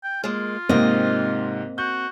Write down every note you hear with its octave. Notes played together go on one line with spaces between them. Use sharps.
G5
G#3 A#3 F4
G#2 C3 A#3 C4 D#5
F#4 G6